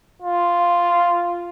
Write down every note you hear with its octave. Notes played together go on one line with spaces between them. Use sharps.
F4